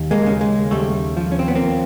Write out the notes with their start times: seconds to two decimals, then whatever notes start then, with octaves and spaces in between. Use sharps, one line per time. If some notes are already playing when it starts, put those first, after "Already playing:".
Already playing: D#2
0.11 G#3 A#3
0.27 C#3
0.41 G#3
0.71 D#2 G3 A3
1.17 F3
1.32 C#4
1.39 C4
1.48 B3
1.55 A#3 C4